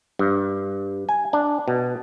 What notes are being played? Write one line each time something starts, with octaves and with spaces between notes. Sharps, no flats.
G2
G#5
D4
B2